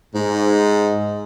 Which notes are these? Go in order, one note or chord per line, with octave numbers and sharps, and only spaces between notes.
G#2